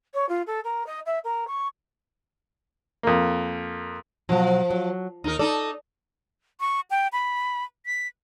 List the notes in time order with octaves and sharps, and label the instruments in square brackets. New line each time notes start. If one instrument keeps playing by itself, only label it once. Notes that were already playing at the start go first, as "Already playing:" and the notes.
[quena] C#5
F4
A4
A#4
D#5
E5
A#4
C#6
[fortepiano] F2 A#3
[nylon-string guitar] B2 F#3 [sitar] F3
[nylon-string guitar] F#3
[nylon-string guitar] D#2 [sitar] D#4 A#4
[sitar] D#4 A4 [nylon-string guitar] D5
[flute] C#6
G5
B5
B6